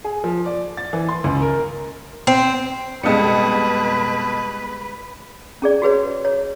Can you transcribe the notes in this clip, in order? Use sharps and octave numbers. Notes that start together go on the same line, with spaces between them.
G#4
F3
D5
A6
E3
C6
C#2
A#4
C4
F2 B2 G3 G#3 B4 C#7
C#4 G#4 D5
F#4 G#4 B4 C#5
C#5